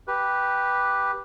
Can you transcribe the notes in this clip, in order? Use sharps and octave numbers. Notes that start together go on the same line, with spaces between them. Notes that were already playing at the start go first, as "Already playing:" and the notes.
G4 B4